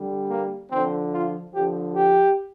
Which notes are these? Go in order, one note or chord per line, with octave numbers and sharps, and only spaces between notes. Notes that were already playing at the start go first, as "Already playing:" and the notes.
Already playing: D3 G3
A#3
D3 F3 C4
F4
D3 F3 G4
G4